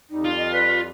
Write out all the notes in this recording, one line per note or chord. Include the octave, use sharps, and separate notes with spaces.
F2 G3 D#4
F4
D#5
B4 D5